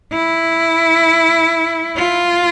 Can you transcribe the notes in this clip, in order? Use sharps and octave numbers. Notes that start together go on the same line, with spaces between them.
E4
F4